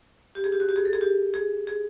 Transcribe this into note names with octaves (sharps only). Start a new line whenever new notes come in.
G4
G#4
G4
F#4
G4
G#4
A4
G#4
G4
G#4
G#4